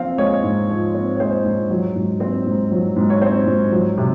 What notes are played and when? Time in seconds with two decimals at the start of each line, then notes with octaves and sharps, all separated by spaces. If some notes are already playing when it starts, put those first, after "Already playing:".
Already playing: F3 C4 F5
0.18 G#3 C#5
0.44 G#2
0.69 F3
0.94 C4
1.16 C#5
1.20 G#3 C5
1.44 G#2
1.70 F#3
1.96 G#2
2.20 C4 C5
2.46 G#2
2.72 F#3
2.96 G#2
3.10 C#5
3.22 C4 C5
3.47 G#2
3.72 F#3
3.98 C3